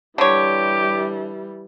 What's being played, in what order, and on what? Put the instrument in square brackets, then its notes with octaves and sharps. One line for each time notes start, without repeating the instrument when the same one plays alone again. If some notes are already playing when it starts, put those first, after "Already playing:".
[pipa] D3 C#5 [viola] E3 G3 [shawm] G4